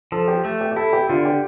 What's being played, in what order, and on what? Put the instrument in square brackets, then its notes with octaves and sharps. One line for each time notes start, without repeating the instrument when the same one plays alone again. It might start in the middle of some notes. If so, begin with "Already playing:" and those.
[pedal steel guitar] F3 [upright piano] A4
[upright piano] G4
[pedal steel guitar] A3
[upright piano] G4
G4
[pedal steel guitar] E4 [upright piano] A4
[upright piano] G4
[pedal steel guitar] D3 [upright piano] F4
[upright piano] G4